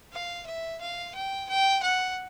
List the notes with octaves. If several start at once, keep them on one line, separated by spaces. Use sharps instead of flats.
F5
E5
F5
G5
G5
F#5